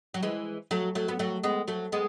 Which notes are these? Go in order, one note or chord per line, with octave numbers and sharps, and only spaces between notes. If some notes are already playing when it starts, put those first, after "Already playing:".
F#3
E3 G#3
F#3 A3
F#3 A3
B3
F#3 A3
G#3 B3
F#3 A3
G#3 B3